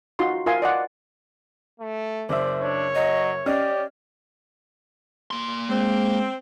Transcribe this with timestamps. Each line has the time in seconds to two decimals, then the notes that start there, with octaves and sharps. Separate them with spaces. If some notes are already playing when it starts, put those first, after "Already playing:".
0.19 D#4 F4 F#4 C6
0.46 F4 A#4 E5 F5 G#5 C6
0.62 D5 D#5 F#5
1.80 A3
2.29 F#1 C5 D5 E5
2.62 D4 C#5
2.95 F#3 D#5
3.46 C#4 G4 D5 D#5 F6
5.31 A#3 C6
5.69 G#3 C4